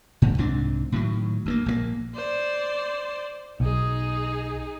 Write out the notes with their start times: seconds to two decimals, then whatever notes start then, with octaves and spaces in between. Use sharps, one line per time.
0.22 G#2
0.38 C2 G#2 C4 D4
0.92 A2 D#3 F#3
1.46 D2 A3 A#3
1.66 A#1 D3 A#3
2.15 C5 D5
3.60 B1 D#4 G#4